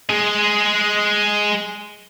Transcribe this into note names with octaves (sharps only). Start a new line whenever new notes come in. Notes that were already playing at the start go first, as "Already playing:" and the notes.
G#3 G#4